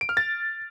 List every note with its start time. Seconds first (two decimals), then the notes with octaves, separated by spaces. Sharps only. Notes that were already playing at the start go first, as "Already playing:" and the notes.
0.01 D7
0.09 F6
0.17 A6